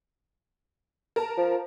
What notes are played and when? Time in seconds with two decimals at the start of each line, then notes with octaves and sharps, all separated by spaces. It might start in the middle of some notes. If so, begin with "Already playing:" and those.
1.16 A#4 A5
1.38 F3